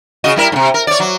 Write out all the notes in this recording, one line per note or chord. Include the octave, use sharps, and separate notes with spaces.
C#3 F#4 D#5
G3 E4 A#4
G#2 C3
A#4
C#5 D5
F#3